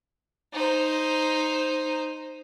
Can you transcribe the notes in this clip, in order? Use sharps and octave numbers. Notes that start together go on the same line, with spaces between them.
D#4 C5